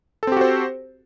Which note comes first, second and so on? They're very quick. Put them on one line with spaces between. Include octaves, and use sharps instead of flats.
A4 C4 G4 F#4 C5